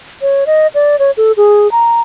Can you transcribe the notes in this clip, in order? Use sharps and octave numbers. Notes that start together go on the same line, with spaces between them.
C#5
D#5
D5
C#5
A4
G#4
A#5